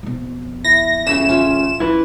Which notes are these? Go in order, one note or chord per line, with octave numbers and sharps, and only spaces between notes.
F2 B2
E4 A#6
D2 C#3 E5 B5 C#6 E7
A1 C#4 F4 E5
D#3 F3 E4 B4